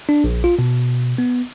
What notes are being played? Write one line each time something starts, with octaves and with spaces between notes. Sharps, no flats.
D4
A#1
F4
B2
B3